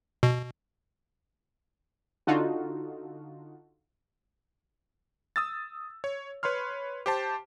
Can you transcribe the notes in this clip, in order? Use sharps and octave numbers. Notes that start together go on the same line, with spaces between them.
B2
D3 D#4 F4 F#4 A4
D#6 E6 A6
C#5
B4 C#5 B5 C6 F6
G4 C5 A5